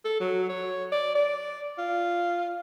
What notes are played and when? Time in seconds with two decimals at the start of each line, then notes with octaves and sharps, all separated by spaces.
0.05 A4
0.20 F#3
0.49 C#5
0.92 D5
1.15 D5
1.78 F4